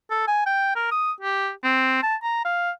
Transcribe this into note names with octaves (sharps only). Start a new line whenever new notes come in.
A4
G#5
G5
A#4
D#6
G4
C4
A5
A#5
F5